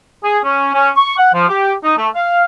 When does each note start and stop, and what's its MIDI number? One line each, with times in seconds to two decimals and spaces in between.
0.24 0.38 68
0.44 0.70 61
0.74 0.90 61
0.97 1.17 85
1.18 1.33 78
1.34 1.45 53
1.49 1.73 67
1.84 1.95 63
1.97 2.08 57
2.15 2.43 77